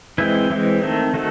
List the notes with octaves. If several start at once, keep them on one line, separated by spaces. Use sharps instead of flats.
E3 G#3 C4 E4
E3 G#3 C4
D#3 A3 C4
D#3 A3 F#4